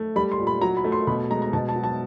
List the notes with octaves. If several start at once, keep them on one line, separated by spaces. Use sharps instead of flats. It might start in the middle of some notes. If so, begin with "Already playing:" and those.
Already playing: A3
G3 B5
C6
A#2
B5
F#3 A#5
B5
A3
C6
B2 B5
G#3 A#5
A#5
B2 A5
A5
F#3
A5